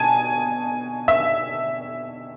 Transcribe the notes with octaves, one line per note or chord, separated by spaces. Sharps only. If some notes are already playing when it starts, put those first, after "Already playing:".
Already playing: B2 G#5 A5
E5